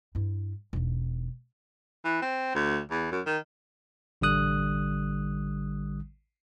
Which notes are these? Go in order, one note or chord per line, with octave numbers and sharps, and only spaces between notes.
G2 E4
E1 D#4
E3
C4
D2
E2
F#2
D#3
A1 D3 G3 D#6 F#6